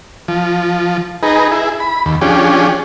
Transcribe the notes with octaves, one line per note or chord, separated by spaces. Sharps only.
F3
D#4 G#4 B4 A#5
E4 G#4
B5
D#2
F3 C#4 D4 G4 G#4